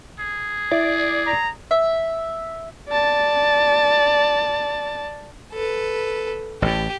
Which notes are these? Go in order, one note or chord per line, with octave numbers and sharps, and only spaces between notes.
G#4
E4 D5
A#5
E5
D5 A5
A4 B4
A1 A2 G4